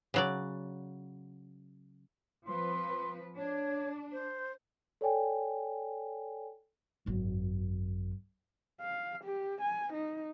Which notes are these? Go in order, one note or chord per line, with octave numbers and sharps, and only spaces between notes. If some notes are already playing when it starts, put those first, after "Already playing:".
C#3 F#3 D5
F3 C4 B4 C6
D4 C#5
C5
A4 C#5 D5 G5 G#5
G#1 F#2
F5
G4
G#5
D#4